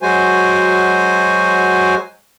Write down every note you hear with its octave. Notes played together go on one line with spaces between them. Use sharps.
F#3 G#3 F#4 C5 G#5